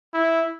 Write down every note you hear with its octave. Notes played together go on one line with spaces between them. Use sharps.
E4